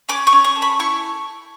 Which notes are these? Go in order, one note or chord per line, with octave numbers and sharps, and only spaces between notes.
C#4 D6
C#6
C#4
C#6
A4
B5
E4 C#6